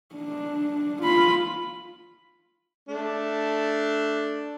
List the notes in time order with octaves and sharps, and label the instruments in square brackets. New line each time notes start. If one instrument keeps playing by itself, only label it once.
[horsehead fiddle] D4
F4 B5
[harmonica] A3 D4